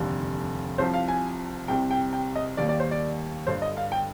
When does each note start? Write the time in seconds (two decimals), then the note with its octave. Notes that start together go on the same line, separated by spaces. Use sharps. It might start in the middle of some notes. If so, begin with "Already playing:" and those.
Already playing: F1 D#2 D3 G3
0.78 C2 C3 F3 C5
0.94 F5
1.08 G#5
1.68 C2 C3 G3 G5
1.91 G5
2.13 G5
2.36 D#5
2.57 D#2 D#3 G3 A#3 D5
2.69 D5
2.80 C5
2.91 D5
3.47 G1 G2 D3 C5
3.62 D#5
3.77 F5
3.92 G5